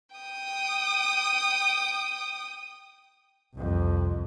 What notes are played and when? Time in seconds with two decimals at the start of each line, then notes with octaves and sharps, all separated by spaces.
0.16 G5 D#6
3.55 C2 F2